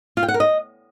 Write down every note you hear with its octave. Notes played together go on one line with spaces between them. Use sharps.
F4
G5
F#5
A#4
D#5